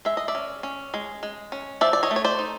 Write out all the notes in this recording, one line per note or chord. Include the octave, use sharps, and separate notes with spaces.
G#3 E5
D#5
D5 E5
C#4
C#4
G#3
G#3
C#4
F3 D5 E5
D5
C#5 D#5
A3
C#5
C5 D5
D#4